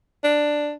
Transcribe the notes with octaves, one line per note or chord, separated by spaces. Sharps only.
D4